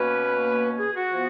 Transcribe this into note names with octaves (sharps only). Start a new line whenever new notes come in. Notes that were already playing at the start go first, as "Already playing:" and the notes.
Already playing: B2 A#3 C#4 B4
G#4
F#4
F3 B3